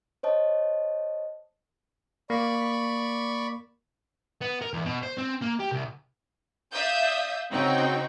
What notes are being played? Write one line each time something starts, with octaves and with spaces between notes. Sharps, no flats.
C5 C#5 D#5 A5
A#3 D5 B5 C#6
B3
A#4
E2
B2
C5
C4
A#3
G4
C2
D5 E5 F5 D#6 E6 G6
C#3 C4 D#4 F#4 G5